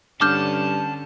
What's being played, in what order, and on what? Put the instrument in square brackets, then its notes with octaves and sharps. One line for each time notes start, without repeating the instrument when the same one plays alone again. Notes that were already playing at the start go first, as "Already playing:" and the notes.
[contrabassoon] G2 [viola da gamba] D3 C#4 [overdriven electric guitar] A5 [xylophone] D6 F6 G6